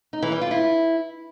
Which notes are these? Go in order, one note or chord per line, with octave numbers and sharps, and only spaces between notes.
D#4
E3
G3
F4
E4